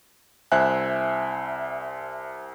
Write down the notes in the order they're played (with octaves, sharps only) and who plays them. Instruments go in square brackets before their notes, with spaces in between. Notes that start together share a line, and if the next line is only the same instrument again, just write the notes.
[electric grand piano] C2 C5 E5 G#5 F#6